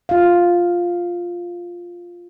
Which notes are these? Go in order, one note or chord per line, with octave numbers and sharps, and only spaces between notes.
F4 F5